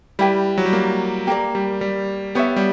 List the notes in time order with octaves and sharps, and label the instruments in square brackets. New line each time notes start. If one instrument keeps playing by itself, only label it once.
[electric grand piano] G3 [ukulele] E4 G4 B4
[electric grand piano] F#3
G3
A#3
[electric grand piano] A#3 [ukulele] G4 A#4 D5
[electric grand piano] G3
G3
[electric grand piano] B3 [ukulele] G4 C#5 E5
[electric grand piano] G3